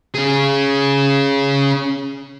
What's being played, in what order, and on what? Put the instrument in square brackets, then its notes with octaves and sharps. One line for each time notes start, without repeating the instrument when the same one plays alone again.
[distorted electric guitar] C#4 G#4